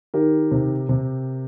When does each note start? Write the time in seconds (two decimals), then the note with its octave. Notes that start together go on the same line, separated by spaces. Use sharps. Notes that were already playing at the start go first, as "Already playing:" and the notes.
0.14 D#3 G4 A#4
0.51 C3
0.89 C3